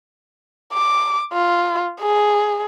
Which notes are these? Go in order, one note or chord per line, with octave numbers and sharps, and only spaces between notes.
D6
F4
G#4